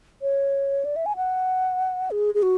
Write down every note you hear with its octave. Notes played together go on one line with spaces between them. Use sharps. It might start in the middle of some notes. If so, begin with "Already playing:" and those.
C#5
D5
E5
G#5
F#5
G#4
G#4
F#4